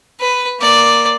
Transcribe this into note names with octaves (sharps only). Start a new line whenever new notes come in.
B4
A#3 D5